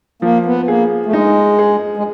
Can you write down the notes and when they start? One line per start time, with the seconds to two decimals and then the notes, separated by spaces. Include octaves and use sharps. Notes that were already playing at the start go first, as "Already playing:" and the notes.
0.22 F3 A#3
0.46 B3
0.68 A#3 G#4
1.06 A3
1.13 G#3 D#4
1.59 G#4
1.97 G#3